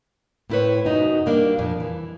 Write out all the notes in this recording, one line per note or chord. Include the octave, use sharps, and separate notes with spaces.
A2 C4 E4 A#4 B4 C#5
F#2 C3 F#3 B3 D#4 F#4
G3 A#3 D4
F2 A#2 A#3 D4
E3